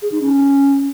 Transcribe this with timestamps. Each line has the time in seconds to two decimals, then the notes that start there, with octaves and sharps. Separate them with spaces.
0.02 G#4
0.12 D#4
0.21 C#4